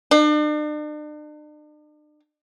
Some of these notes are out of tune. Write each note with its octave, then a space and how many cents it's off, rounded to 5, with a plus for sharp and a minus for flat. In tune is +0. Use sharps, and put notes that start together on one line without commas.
D4 +45